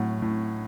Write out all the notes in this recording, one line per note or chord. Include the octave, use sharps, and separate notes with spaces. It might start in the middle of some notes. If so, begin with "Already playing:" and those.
Already playing: A2 F#3
A2